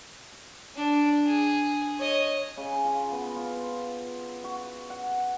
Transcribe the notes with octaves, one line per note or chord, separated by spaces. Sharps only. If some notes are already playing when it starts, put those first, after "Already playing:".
D4
G#4
C#5 D#5
C#3
F4
B3
F4
F#4
F#5